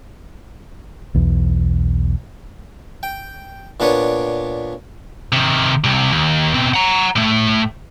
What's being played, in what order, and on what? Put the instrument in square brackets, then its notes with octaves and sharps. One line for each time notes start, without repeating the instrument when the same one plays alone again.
[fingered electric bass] B1 E2
[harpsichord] G5
A#2 B3 D4 B4 C#5
[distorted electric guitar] C3 D#3
C2 C3
D#2
B2 C4
F#5 A#5
A2 A3